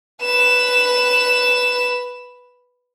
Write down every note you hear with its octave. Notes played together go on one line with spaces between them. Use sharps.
B4 E7